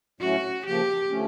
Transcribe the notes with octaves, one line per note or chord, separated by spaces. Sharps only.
A2 F#3 A3 C#4 E4 F#4
C#3 F3 A#3 G4
D3 F3 A3 C#4